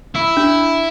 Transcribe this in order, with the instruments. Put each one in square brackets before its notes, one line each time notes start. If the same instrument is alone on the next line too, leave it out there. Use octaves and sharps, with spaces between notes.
[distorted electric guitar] E4
[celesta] D4